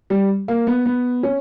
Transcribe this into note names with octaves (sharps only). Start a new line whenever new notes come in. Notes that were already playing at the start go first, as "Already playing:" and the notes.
G3
A#3
B3
B3
C#4